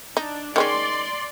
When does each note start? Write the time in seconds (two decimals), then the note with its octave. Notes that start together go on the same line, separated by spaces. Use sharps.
0.17 D4 D#4
0.56 D#3 G#3 C#4 D5 C6